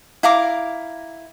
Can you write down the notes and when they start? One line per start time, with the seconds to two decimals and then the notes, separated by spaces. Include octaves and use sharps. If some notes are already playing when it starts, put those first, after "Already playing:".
0.23 E4 F5 A#5 D6